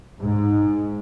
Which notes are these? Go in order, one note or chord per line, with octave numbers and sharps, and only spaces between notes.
G#2